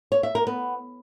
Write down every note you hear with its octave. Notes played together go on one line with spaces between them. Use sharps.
C#5
E5
A#4
B3